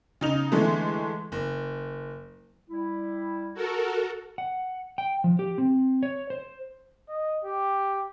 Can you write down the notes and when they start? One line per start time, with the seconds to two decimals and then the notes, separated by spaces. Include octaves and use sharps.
0.21 C#3 D#4 F7
0.52 D3 E3 G#3 A3
1.32 F#1
2.70 G3 E4
3.54 F#4 A4 A#4
4.38 F#5
4.98 G5
5.24 F3
5.39 G4
5.58 C4
6.03 C#5
6.30 C5
7.09 D#5
7.44 G4